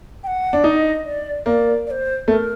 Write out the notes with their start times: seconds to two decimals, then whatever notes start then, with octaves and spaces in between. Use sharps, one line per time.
0.24 G5
0.27 F#5
0.53 D4
0.64 D#4 D#5
1.05 D5
1.46 A#3 D5
1.87 D5
1.91 C5
2.28 A3 A#4